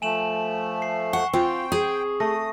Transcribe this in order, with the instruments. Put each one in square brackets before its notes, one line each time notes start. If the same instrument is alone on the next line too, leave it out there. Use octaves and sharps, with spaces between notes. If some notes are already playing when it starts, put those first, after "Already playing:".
[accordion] F3 A3 [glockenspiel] G#5 E7 F#7
[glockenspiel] C7
[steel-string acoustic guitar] F#5 [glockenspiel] C#6
[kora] C4 [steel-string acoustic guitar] F4 [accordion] G5
[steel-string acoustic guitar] G#4 [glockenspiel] D#6
[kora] A3 [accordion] D#6 [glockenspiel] A#6